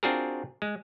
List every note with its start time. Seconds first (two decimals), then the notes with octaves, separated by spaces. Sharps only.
0.03 C4 D4 F4 F#4 G#4 A#4
0.62 G#3